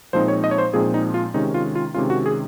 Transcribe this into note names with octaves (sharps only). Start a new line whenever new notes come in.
A#2 F3 G#3 C4 D#4 C5
C#5
D#5
C#5
C5
A#2 F3 G#3 C4 D#4 G#4
D#4
F4
C3 D#3 G#3 C#4 D#4
F4
F4
C3 D#3 G#3 C#4 F4
F#4
G#4